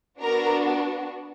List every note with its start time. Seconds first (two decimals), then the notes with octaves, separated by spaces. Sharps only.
0.22 B3 D4 F#4 A#4 A#5